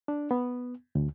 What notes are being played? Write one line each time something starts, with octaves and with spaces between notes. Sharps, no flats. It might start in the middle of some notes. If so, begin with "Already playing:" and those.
D4
B3
D2